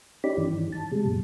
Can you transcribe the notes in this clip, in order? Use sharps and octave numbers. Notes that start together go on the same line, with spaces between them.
C#4 D#4 G4 D5 B5
G2 D#3 E3
A5
C3 G3 G#3
F#2 A#2